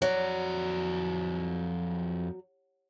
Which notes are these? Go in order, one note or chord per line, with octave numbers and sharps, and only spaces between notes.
F2 F#3 D5